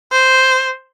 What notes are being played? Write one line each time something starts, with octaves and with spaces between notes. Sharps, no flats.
C5